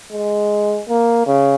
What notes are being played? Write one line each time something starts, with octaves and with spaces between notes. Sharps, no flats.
G#3
A#3
C#3